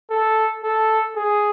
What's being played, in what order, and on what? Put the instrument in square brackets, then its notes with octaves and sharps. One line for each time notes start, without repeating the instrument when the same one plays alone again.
[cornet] A4
A4
G#4